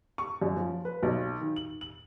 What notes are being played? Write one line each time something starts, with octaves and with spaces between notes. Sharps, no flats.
C#6
F#2
F3
B4
B1
D#3
F#7
F#7